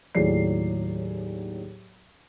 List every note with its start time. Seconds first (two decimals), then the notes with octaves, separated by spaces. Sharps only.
0.15 D#2 A2 F#3 G#4 D5 C7